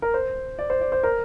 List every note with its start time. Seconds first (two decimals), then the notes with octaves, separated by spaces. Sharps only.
0.02 A#4
0.14 C5
0.59 D5
0.70 C5
0.81 D5
0.92 C5
1.03 A#4